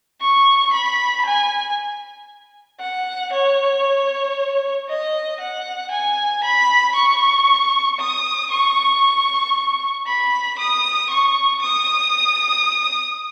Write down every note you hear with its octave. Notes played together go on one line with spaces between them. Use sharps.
C#6
B5
G#5
F#5
C#5
D#5
F#5
G#5
B5
C#6
D#6
C#6
B5
D#6
C#6
D#6